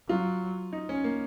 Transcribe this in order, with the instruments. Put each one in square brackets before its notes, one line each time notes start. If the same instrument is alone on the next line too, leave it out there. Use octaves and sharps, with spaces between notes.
[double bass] F#3 [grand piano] F4
[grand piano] D#4
C#4
A#3